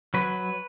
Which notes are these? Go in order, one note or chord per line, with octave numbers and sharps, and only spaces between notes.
F#3 B4